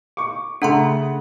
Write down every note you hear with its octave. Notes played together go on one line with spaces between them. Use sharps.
C#6 D6
C#3 A3 D4 F#5 A#5 C6